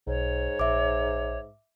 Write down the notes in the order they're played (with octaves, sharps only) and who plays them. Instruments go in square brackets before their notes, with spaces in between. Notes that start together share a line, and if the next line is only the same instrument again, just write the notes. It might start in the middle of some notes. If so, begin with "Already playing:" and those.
[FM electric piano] B1 [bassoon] G#2 [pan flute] C#5
[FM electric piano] A#1 [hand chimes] E5 D6